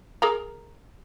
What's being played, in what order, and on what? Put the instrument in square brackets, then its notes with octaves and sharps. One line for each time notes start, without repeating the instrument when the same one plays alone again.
[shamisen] G#4 A#4 A#5